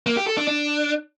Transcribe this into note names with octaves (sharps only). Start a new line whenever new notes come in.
A#3
G4
A4
D4
D4